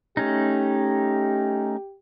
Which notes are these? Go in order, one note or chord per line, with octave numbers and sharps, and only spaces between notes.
A3 C#4 D#4 G4